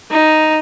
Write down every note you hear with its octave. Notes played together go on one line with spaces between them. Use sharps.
D#4